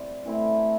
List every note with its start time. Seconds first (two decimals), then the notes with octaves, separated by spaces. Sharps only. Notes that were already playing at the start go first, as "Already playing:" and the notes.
Already playing: A2 G3 C4 G4
0.25 E3 A3 C4 E4